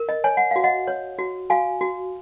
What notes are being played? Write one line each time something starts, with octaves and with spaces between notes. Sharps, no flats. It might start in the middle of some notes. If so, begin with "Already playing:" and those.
Already playing: A#4
D#5
C#5 G#5
F#5
F#4 F5
D#5 F#5
C#5
F#4
F#4 F5 G#5
F#4